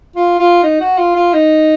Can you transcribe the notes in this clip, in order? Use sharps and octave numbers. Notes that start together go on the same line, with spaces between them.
F4
F4
D#4
F#4
F4
F4
D#4